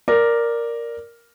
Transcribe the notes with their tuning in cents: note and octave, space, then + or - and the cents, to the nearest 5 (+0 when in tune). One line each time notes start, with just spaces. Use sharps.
A#4 +0 D5 +0